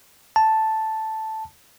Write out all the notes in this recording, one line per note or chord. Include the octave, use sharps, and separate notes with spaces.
A5